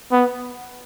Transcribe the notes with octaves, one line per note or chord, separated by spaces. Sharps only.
B3